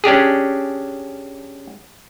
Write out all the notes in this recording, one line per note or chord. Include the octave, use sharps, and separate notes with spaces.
C#4 D4 G4 G#4